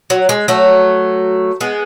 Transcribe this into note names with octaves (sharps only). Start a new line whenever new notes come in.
F#3
G#3
F#3 A3
G#3 B3